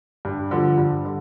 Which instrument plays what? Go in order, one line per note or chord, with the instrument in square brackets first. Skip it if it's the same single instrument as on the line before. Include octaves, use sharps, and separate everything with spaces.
[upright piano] G2
D3 F3
G2
D3